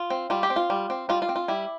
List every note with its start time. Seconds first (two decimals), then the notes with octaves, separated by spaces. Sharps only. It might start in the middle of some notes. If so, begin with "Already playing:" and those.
Already playing: F4
0.10 C4
0.30 G3 F4
0.43 G4
0.50 C4
0.56 F4
0.70 G3
0.90 C4
1.09 G3 F4
1.22 F4
1.29 C4
1.36 F4
1.48 G3 E4